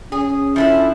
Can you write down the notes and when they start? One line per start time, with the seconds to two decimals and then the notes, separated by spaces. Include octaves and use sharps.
0.12 C#4 G#4
0.56 F3 D4 E4 A4 E5